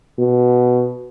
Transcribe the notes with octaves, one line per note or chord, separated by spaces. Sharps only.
B2